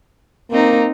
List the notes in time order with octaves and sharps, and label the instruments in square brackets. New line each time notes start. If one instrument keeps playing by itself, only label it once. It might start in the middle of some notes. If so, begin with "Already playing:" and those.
[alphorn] A#3 [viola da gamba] C4 D#4